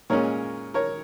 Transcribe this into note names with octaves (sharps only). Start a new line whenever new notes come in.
A#2 G#3 C#4 A#4 C#5
A#4 C#5